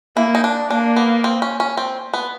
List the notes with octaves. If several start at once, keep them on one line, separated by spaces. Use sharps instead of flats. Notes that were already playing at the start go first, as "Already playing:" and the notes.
A#3 E4
D#4
D4
A#3 D4
B3
C4
C#4
C#4
C4
B3